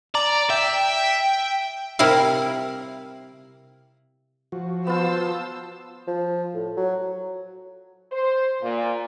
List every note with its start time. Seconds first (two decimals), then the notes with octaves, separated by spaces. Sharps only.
0.15 D5 A#5
0.50 E5 G5
1.99 C3 G3 E4 A#4 F5
4.52 F3 F#4
4.87 B3 F4 C5 A5 E6
6.08 F3
6.54 A2
6.77 F#3
8.11 C5
8.62 A#2